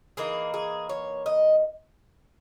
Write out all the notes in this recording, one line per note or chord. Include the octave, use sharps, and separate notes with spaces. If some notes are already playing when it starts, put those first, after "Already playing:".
E3 A#3 D#4 G#4
G#4
C#5
D#5